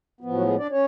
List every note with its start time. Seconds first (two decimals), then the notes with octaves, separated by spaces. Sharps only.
0.21 A2 F3 B3
0.34 F#3 F#4
0.46 G#3 G#4
0.58 D4 D5
0.71 C#4 C#5